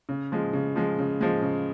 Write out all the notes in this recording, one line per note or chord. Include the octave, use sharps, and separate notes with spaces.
C#3
F3 G#3
C#3
F3 G#3
C#3
F3 G#3
C#3